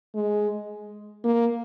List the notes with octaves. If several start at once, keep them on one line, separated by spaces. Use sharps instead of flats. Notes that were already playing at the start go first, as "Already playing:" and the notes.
G#3
A#3